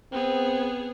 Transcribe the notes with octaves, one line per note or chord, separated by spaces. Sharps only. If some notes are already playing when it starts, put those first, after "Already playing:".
B3 C4 G#4